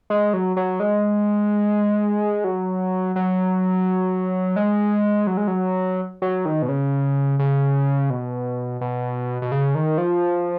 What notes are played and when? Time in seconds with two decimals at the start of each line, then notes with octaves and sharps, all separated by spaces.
0.10 G#3
0.33 F#3
0.56 F#3
0.80 G#3
2.44 F#3
3.16 F#3
4.56 G#3
5.27 F#3
5.37 G#3
5.48 F#3
6.22 F#3
6.45 D#3
6.62 B2
6.69 C#3
7.39 C#3
8.10 B2
8.81 B2
9.42 B2
9.52 C#3
9.75 D#3
9.98 F3